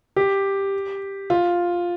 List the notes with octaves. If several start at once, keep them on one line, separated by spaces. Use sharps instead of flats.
G4
F4